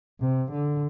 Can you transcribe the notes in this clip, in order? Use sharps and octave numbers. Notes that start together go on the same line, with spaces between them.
C3
D3